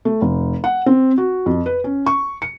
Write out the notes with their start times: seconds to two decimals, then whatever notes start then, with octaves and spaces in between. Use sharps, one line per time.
0.05 A3
0.22 F1
0.64 F#5
0.86 C4
1.18 F#4
1.46 F2
1.66 B4
1.84 C#4
2.06 C#6
2.42 C#7